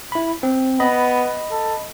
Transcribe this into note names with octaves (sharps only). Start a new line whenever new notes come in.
E4 B5
C4
B3 D#5 B5
A4